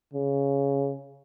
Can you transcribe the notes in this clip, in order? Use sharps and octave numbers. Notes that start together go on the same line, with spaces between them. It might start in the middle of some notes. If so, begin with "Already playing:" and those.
C#3